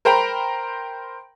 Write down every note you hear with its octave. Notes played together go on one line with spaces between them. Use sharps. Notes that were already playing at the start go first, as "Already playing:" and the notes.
A#4 C5 G5 A#5 B5